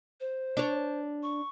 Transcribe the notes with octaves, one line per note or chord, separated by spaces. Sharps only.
C5
D4 C#5
C#6